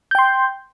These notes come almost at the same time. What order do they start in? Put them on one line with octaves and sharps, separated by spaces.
G6 G5 C6